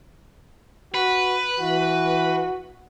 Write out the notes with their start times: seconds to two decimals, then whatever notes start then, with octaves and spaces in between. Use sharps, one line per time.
0.94 F#4 B4
1.59 E3 F#4